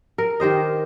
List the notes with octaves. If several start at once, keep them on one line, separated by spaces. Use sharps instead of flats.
A#4
D#3 G4 C5 D#5